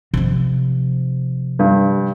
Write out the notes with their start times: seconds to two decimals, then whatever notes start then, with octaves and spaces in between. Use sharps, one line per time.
0.14 C3 F3
1.59 G2